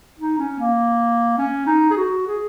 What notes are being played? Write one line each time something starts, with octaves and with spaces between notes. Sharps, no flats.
D#4
C#4
A#3
C#4
D#4
G#4
F#4
G#4